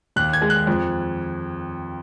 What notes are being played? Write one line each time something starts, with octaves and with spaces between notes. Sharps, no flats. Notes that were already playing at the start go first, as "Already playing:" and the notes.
D#2 F#6
G#6
G#3
F#6
F2